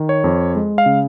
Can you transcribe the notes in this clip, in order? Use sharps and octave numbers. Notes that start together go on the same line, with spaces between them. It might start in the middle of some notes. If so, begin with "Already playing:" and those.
Already playing: D#3
C#5
F2
G#3
F5
C#3